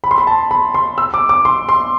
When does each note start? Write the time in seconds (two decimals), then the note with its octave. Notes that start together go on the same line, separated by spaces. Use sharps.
0.04 B5
0.11 C6
0.18 B5
0.27 A5
0.51 B5
0.74 C6
0.98 E6
1.14 D6
1.29 D6
1.45 C6
1.69 C6